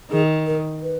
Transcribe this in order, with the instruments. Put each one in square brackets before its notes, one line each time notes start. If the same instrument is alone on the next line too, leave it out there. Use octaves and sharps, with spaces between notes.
[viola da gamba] D#3 [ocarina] G#4
[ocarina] A#4
B4